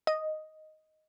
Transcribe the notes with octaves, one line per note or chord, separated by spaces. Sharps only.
D#5